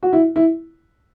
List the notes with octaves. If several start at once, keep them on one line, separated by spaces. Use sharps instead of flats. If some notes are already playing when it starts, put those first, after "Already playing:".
F#4
E4
E4